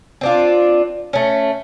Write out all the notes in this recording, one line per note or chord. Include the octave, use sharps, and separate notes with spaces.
C4 D4 F4
A3 C#4